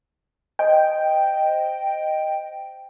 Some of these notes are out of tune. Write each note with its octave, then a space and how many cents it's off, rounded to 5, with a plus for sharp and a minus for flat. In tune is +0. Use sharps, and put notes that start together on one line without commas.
C5 +0 D#5 +0 G5 +0